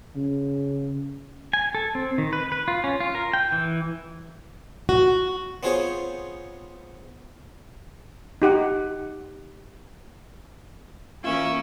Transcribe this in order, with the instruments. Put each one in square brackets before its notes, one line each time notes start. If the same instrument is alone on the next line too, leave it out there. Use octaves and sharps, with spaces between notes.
[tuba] C#3
[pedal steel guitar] G#5
A4
C4
D#3
B4
B4
F4
C#4
F4
A#4
G5
E3
[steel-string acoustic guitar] F#4
[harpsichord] B3 C4 F4 G#4 C5 C#5
[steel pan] D#4 G4 F#5
[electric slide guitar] E3 A#3 F4 [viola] C#4 A#4 [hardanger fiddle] E5